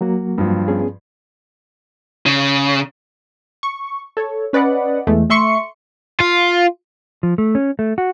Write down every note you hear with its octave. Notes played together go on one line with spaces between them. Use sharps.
F#3 A#3 F#4
G2 F3
B3 C#4 G#4
C#3
C#6
A4 C#5
C#4 B4 D5 D#5 F#5
E2 E3 G#3 A3
A3 E5 C6 C#6 C#7
F4
F3
A3
C#4
A3
F#4